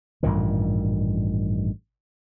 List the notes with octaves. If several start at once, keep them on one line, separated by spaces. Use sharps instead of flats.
A1 G2 A#2 D#3